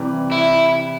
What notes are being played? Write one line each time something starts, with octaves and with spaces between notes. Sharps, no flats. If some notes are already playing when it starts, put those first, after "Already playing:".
Already playing: C3 E3 G3
E4